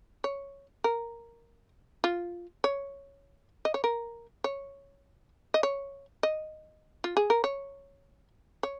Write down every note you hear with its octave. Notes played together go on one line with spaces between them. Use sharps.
C#5
A#4
F4
C#5
D#5
C#5
A#4
C#5
D#5
C#5
D#5
F4
G#4
A#4
C#5
C#5